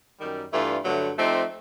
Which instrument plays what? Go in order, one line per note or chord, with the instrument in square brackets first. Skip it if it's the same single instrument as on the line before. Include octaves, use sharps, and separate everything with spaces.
[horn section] F#2 D#3 G3
G2 E3 A3 D4 F4
G2 D3 F#3 A3
F3 A3 C4 D#4 G4